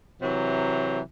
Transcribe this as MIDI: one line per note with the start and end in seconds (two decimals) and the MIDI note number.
0.22 1.00 48
0.22 1.00 52
0.22 1.00 54